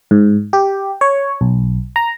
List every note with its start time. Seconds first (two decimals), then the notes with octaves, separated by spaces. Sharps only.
0.11 G#2
0.53 G4
1.01 C#5
1.41 B1
1.96 A#5